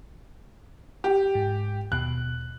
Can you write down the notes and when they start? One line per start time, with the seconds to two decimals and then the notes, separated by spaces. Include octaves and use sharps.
1.04 G4
1.35 G#2
1.92 D#2 B2 F#6